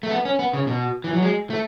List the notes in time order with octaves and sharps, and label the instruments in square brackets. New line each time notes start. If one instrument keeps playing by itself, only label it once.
[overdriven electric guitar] A3
B3
C#4
B3
C#3
B2
E3
F#3
G#3
A3